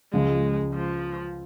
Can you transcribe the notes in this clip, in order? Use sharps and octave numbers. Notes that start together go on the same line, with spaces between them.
C#2 C#3 F3 G#3
F3